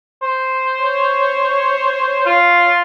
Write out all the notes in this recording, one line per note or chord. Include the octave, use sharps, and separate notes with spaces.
C5
C#5
F4